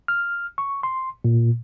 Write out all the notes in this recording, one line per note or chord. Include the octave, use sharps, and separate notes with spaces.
F6
C#6
C6
A#2